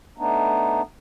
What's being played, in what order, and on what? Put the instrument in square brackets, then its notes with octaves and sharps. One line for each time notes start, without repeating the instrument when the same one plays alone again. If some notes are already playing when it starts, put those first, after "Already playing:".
[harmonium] A3 B3 D4 D#4